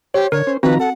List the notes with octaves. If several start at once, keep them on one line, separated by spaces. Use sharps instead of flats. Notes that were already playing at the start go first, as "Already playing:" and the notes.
G4 C5 C#5
D3 A#4 C#5
C#4 C5
D#3 F3 C4 F#4 B4 A#5
A4 F#5